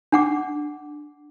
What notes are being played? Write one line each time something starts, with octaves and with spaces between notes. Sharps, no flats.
D4 F#5 D6